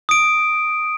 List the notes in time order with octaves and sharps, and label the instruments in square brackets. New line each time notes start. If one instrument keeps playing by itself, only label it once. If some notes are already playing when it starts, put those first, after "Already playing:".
[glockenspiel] D#6 D7